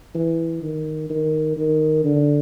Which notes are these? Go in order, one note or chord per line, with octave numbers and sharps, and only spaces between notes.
E3
D#3
D#3
D#3
D3